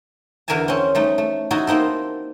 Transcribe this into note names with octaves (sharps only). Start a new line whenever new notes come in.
E2 D3 A#4 E5 G#5 A5
C4 C#4
G3 A3 D#4
A3
D#4 E4 F#4 A4
A#3 C4 D#4 A4